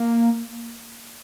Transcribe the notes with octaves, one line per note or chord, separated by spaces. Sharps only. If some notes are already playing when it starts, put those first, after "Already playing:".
Already playing: A#3